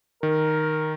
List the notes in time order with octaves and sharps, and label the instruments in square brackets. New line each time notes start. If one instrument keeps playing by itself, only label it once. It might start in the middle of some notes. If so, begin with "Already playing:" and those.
[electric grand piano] D#3 [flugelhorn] A#4